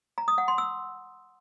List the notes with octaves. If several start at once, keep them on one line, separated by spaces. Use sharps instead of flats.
A#5
D#6
F#5
C6
E6